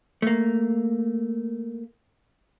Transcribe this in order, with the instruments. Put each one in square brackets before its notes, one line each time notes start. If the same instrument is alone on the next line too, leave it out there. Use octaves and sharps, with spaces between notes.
[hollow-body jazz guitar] A3 A#3